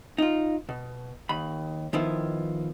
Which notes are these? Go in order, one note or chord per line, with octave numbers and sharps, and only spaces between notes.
D#4 F4
B2
D#2 B5
D#3 F3 B3 E4